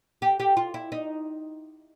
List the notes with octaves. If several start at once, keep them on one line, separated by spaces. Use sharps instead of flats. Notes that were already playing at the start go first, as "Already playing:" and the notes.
G4
G4
F4
E4
D#4